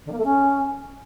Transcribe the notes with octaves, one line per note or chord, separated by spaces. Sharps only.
D3
A#3
A3
C#4